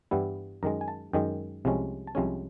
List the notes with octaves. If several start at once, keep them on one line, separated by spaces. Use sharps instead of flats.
G2 E3 G3 B3 E4
F#2 D#3 G#3 A#5
G#5
A5
F#2 D#3 G#3 G5
C2 C3 F3 G#3 C#4
A5
C2 C3 F3 G#3 C#4 G#5